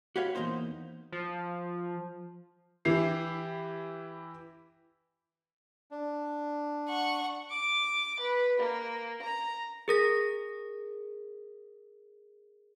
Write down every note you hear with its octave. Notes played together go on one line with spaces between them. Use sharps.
F#4 G4 B4 C#5 F5
E2 G#2 A#3 D#4 C5
F3
E3 E4 G4 C7
D4
F#5 C#6
D6
B4
A#3
A#5
G#4 A#4 A#6